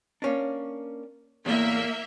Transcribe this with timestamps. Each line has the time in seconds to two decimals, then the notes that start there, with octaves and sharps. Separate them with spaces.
0.22 A#3 C#4 D4
1.46 E2 A2 A#3 E5